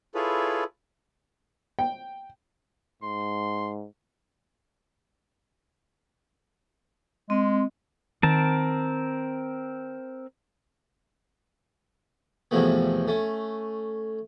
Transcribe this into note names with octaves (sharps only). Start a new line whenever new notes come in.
E4 F4 G#4 A4 B4 C#5
G5
G#2 C6
G#3 C4
D#3 C4 A#4 A5
E2 A2 C3 F3 A3 B3
A3 C#4